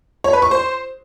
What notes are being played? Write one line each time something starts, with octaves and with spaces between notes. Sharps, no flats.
C#5
B4
C#6
C5